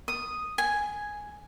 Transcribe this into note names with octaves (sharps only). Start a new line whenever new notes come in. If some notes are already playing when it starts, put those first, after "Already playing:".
D#6
G#5